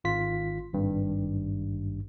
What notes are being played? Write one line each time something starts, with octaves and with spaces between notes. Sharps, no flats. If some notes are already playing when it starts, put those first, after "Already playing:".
G#1 F4 B6
G#1 G2